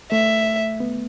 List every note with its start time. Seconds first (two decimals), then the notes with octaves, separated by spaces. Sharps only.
0.11 A3 E5
0.80 B3